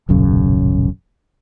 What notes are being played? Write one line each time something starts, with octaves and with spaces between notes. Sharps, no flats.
D#1 B1 F#2 C#3